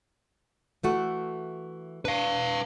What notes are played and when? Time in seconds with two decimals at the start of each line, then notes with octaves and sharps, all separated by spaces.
0.83 E3 A3 F#4
2.05 D4 B4 F5